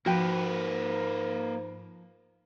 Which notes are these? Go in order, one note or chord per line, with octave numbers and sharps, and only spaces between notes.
G#2 F3 A#3 F#4 B4 G5